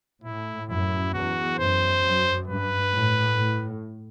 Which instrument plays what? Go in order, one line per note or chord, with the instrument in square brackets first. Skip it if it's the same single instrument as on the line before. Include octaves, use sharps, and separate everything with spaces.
[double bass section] A2 [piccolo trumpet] E4
[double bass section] F#2 [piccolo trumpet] E4
[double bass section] E2 [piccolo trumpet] F#4
[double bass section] F#2 [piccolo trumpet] C5
[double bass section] F#2
[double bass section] G2 [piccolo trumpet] B4
[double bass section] A2
A2